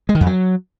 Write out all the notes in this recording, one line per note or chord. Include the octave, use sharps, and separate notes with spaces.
G#3
D#3
F2
F#3